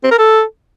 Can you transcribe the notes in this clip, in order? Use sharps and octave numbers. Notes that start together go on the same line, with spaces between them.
C4
A#4
A4